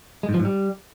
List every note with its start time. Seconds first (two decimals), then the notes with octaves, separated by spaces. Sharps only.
0.23 G#3
0.29 G#2
0.34 F3
0.40 G#2
0.45 G3